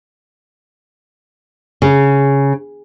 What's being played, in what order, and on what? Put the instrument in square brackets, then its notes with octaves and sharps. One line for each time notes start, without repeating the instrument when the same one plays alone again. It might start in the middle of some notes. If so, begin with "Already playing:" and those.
[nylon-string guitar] C#3